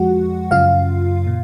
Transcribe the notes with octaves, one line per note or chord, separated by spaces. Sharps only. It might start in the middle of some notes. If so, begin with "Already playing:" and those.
Already playing: F2 F3 G#3 F#4 F#5
F#2 C#3 F#3 F4 F5
A#2